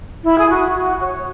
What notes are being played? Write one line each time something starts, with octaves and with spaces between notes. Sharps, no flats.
E4
G#4
F#4
F#4
C#5